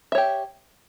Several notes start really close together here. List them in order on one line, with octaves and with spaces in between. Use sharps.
E5 C#5 G4